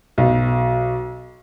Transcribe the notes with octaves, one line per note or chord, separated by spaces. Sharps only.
B1